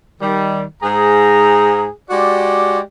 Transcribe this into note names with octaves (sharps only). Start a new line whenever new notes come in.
D#3 G3
G#2 G#4 A#5
G#3 F#4 G4 D5